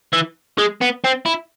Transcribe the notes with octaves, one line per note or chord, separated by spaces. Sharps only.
E3
G#3
B3
C4
E4